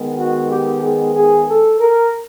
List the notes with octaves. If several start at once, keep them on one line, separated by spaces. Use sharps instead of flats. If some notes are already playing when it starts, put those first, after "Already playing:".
Already playing: D#3 G#3 B3
F#4
G4
G#4
G#4
A4
A#4